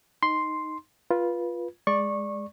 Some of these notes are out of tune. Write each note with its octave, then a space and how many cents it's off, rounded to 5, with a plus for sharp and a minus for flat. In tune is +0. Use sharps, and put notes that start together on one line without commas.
D#4 +0 C6 +0
F4 +0 B4 -20
G#3 +0 D5 +0 C#6 -20